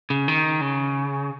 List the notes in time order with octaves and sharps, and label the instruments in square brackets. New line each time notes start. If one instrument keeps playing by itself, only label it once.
[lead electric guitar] C#3
D#3
C#3